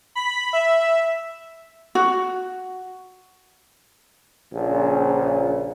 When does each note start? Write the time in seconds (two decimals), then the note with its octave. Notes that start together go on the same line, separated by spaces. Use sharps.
0.15 B5
0.53 E5
1.95 F#4
4.53 A#1 A#2 C#3